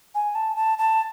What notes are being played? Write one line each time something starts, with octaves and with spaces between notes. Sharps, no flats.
G#5
A5
A5
A5